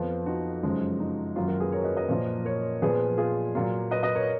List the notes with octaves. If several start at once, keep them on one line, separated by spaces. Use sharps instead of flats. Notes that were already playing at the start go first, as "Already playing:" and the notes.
Already playing: F2 F3 B3 F4
D#4 F#4
F#2 C#3 F3 G#3
D#4
F#2 D#3 F#3 A#3 F4
F#4 A#4
G#4 B4
A#4 C#5
B4 D#5
B4 D#5
A#2 F3 A#3
A#4 C#5
A#2 F3 B3 G#4 B4
F4 G#4
A#2 F#3 A#3 F4
B4 D#5
B4 D#5
A#4 C#5